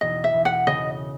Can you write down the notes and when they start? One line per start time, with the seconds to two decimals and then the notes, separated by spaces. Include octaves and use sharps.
0.01 E1 D#5
0.24 E5
0.34 E1
0.45 F#5
0.67 C#3 D#5